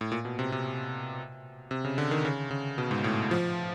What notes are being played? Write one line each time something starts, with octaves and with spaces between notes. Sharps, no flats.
A2
A#2
B2
C3
C3
C3
C#3
D3
D#3
C#3
C#3
B2
G#2
A2
F3